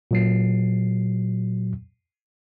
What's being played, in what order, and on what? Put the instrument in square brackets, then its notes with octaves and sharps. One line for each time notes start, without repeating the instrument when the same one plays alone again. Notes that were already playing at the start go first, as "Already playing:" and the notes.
[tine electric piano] A#2 F#3 C7